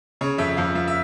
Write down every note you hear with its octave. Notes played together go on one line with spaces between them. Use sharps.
C#3 C#5
F2 E5
F2 F5
F3 E5
E5